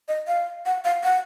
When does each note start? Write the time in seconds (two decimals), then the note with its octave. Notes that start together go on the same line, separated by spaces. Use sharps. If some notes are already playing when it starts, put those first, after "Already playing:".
0.08 D#5
0.28 F5
0.66 F#5
0.85 F5
1.04 F#5